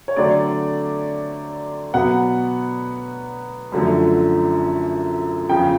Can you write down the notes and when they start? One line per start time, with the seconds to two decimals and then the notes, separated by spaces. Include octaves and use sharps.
0.08 C#5
0.16 D3 F#3 A3 C4 D5
1.94 B2 F#3 B3 F#5
3.72 F#2 D3 F3 A3
5.49 E2 C#3 F3 G5